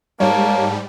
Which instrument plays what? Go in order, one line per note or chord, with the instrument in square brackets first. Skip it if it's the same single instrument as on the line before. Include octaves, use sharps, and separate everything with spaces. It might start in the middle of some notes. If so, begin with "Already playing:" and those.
[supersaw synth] G#2 G3 [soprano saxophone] A#3 [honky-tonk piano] C#5 [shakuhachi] A5